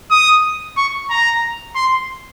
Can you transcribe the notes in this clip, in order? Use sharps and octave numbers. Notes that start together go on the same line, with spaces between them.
D#6
C#6
A#5
C6